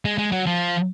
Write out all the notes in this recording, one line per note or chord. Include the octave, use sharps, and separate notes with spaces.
G#3
G#3
F#3
F3